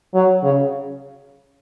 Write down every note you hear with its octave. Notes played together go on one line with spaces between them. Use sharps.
F#3
C#3